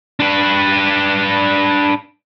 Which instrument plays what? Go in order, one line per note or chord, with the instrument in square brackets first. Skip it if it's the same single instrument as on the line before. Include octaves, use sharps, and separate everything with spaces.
[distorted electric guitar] D4 B4